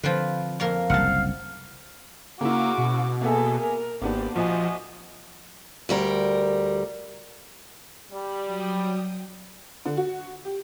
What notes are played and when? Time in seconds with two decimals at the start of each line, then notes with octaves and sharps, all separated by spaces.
0.03 D3 F3 C4 B4
0.60 F2 A#3 A#4
0.90 F#1 C2 F5 F#5 A5
2.41 C#3 A#3 E4 F#4 D6
2.78 B2
3.21 A#3 B3 G#4 A4 E5
3.60 A#4
4.02 G#1 A#3 B3 D4 G4
4.36 A#1 F3 F#4 D#5 G#5
5.89 D2 G3 A#4
8.12 G3
8.45 F#3 G5 D#6
9.85 D3
9.97 F#4
10.45 G4